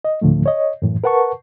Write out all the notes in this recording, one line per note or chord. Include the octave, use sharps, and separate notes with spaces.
D#5
D2 A2 D3 F3 A3
C#5 D#5
F#2 A2 E3
A#4 B4 F#5 A5 C#6